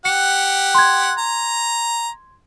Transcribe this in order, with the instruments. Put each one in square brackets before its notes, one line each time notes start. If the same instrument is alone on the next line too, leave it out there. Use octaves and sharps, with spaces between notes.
[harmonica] G4 F#5 [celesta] C#7
[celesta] C6 G#6
[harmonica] A#5